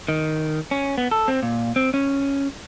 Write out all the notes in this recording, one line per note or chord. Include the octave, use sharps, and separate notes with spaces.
D#3
C#4
B3
A4
C4
A#2
C4
C#4